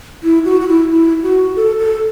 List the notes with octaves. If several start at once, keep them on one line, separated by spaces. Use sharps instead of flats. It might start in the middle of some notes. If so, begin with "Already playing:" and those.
E4
F#4
F#4
E4
E4
F#4
A4
A4